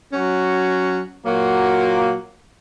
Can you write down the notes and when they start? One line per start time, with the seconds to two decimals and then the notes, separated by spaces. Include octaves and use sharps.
0.12 F#3 C#4 F#4
1.24 A#2 F#3 A#3 F#4